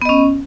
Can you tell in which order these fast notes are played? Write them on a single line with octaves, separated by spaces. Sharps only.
B3 D#5 C#4